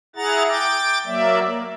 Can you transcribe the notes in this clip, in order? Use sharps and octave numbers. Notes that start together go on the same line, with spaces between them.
E4 G#4 F#5 A#5 A6
G5 D6 A6
F#3 A#3 D5 E5
A#3